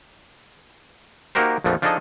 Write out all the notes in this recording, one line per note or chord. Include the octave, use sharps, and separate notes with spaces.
A#3 D#4 F#4 G4 A#4 C5
A#1 F2 F3 A3 B3
F3 D4 D#4 G#4 A4 D#5